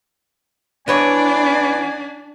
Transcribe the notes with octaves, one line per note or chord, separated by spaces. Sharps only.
E3 B3 D4 C#5 G#5